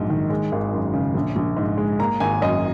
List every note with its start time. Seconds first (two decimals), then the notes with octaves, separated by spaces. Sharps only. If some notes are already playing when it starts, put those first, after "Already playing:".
Already playing: A#1 G#2 F#3
0.10 D#3
0.30 G#3
0.52 G#1
0.73 F#2
0.93 C#3
1.15 A#1
1.36 A#1
1.57 G#2
1.78 G#3
1.99 A#3 A#5
2.20 G#1 G#5
2.41 F#2 D#5